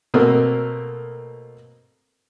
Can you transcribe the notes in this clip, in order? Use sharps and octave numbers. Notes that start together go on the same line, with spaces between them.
B2 A3 A#3 C4 A#4